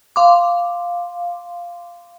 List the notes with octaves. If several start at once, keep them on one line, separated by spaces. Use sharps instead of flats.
F5 C6 D6